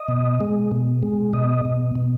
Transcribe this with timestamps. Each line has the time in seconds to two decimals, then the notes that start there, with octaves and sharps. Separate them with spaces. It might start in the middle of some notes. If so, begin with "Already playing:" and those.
Already playing: D#5
0.08 B2
0.41 G#3
0.71 B2
1.03 G#3
1.33 B2 D#5
1.65 B2
1.95 B2